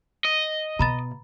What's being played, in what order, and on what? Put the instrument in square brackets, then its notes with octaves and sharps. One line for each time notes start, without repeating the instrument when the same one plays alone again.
[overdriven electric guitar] D#5
[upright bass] B2 [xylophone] A#5 B5 A6